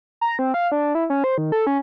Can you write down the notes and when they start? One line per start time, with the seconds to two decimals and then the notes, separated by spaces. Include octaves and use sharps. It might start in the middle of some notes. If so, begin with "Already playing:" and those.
0.21 A#5
0.39 C4
0.54 F5
0.72 D4
0.95 E4
1.10 C#4
1.24 C5
1.38 D#3
1.52 A4
1.67 C#4